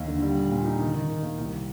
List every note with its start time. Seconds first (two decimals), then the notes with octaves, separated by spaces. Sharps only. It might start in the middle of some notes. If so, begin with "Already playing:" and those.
Already playing: D#2
0.08 D3
0.22 G3
0.37 A#2
0.51 A#2
0.65 D#4
0.80 D#3
0.94 D#3
1.08 D#3
1.23 A#3
1.38 C2